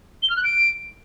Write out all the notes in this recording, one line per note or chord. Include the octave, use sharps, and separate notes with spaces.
G7
F6
F#6
D7